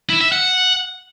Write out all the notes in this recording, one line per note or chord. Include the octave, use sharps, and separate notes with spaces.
E4
E5
F#5